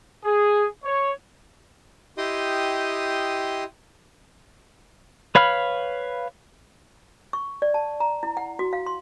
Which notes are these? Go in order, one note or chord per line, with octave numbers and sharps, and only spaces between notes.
G#4
C#5
E4 G4 D#5 G5 C6 D#6
B4 C#5 F5 B5 F6
C#6
D5
A5
A#5
E4
F#5
F#4
F5
C6